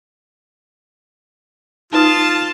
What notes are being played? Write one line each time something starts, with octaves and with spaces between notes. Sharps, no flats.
D#4 F4 B4 A5 D#6